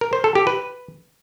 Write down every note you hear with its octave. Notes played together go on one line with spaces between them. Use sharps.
A#4
C5
A4
G4
B4